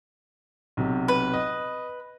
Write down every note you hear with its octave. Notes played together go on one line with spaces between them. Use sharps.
B1 C3
B4
D#5